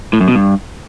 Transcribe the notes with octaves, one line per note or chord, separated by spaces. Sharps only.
A2
F#2
B2
G2